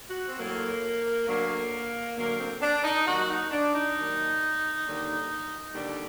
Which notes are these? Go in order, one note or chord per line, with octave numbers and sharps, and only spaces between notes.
F#4
C4
A2 F#3 A#3
D2 D3 F#3 A#3
D2 D3 F#3 A#3
C4
D4
D#4
D#2 D#3 F#3 F#4
D#4
D4
D#4
D#2 D#3 F#3
D#2 D3 G3
D#2 D3 G3 D4